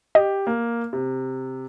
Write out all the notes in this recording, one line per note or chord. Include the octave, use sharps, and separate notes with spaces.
G4 D#5
A#3
C3